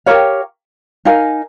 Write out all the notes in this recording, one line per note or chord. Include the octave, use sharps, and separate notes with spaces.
G4 A#4 C#5 F5
D#4 A#4 F5 G#5